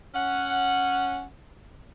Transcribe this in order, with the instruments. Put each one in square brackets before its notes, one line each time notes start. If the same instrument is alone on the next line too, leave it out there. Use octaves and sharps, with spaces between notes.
[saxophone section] C#4 F#5